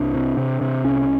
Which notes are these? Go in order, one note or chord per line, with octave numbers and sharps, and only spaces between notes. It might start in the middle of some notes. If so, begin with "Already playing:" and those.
Already playing: C2 D4
C3
C3
C3
C2 C#4